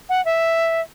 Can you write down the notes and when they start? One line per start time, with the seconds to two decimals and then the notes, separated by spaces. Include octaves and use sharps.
0.09 F#5
0.25 E5